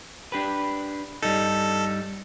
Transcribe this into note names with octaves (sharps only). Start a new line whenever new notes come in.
D4 G4 B4
G2 G3 D#4 A4